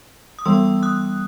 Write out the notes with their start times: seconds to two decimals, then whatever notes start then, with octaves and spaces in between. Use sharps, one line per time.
0.39 D#6
0.45 E3 G3 B3 C6 E6
0.83 D#6 F#6